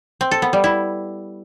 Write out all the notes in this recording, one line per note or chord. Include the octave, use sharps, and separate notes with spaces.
C4
A4
B3
G3
E4